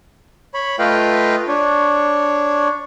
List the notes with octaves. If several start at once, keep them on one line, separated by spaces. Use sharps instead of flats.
C#5 B5
A3 F4 B4 D#5 F5 G5
D4 C#5